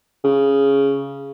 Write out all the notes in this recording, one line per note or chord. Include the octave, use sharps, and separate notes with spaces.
C#3